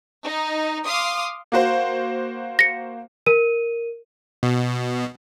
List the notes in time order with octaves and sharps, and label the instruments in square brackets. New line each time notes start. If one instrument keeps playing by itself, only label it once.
[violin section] D#4
F5 C6 D6 D#6
[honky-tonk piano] A#3 F#4 C5
[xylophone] A#6 C#7
[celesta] A#4 D#7
[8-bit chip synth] B2